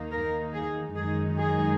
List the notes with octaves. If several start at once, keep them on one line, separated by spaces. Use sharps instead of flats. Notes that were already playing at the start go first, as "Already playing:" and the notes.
Already playing: D#2 D#3 A#3 D#4
A#4
G#4
F#2 D#3 G#3 D#4 G#4
G#4